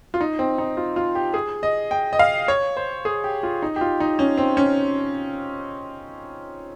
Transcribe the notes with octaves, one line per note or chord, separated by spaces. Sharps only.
F4
D#4
C4
D#4
F4
F4
G4
G#4
D#5
G5
D#5
F5
C#5
C5
G#4
G4
F4
D#4
G4
F4
D#4
C#4
C4
C#4